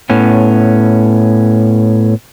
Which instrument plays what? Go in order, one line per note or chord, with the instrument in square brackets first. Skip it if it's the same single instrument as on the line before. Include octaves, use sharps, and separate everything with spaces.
[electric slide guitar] A2 B3 C#4